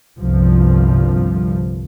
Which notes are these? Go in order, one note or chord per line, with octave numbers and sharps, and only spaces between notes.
G1 C2 G2 F3